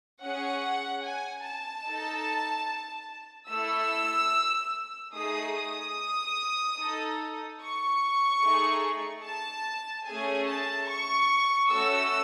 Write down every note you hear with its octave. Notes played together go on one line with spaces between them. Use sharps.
C#4 G#4 F#5
G#5
A5
D#4 A4
A3 E4 A4 E6
A3 D#4 G#4 D#6
D#6
D#4 A4
C#6
A3 D#4 G#4
A5
A3 C#4 G#4 G#5
A5
C#6
A3 C#4 F#4 A4 E6